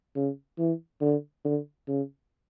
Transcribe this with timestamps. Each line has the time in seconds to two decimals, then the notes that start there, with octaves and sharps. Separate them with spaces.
0.16 C#3
0.59 E3
1.01 D3
1.45 D3
1.88 C#3